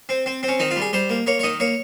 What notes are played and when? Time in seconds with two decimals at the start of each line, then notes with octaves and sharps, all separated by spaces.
0.09 C4
0.26 C4
0.43 C4
0.48 C#4
0.60 D#3 D#4
0.71 F4
0.76 G3
0.82 G#4
0.93 G3 C5
1.10 A#3
1.27 A#3 C#5
1.39 C#5
1.43 D#3 D#5
1.60 A#3 C#5